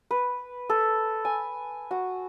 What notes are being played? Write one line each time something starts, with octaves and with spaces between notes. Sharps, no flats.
B4
A4
G#5
F#4